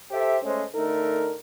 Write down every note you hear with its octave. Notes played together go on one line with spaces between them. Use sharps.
G4 A4 C5 E5
G#3 A3 C#4 C5
D3 A3 D#4 A#4